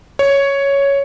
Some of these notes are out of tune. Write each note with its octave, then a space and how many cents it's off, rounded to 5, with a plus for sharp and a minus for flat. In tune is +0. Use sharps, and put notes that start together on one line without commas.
C#5 +5